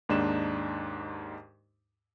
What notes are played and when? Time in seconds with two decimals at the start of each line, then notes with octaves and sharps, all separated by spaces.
0.09 D#2 G#2 D4 D#4 E7